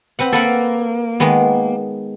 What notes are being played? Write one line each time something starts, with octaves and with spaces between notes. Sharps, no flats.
C4 B4 F#5
A#3 A4 B4 F#5
D#3 G#3 B3